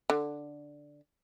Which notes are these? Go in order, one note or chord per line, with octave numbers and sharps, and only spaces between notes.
D3